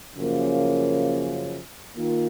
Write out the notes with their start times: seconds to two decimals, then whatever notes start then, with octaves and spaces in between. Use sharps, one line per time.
0.16 F#2 C#3 F3 A#3
1.97 D#3 A#3 F4